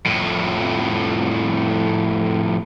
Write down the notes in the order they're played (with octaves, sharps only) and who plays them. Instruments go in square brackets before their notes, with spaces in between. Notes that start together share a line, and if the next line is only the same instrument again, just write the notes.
[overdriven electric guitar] F2 A2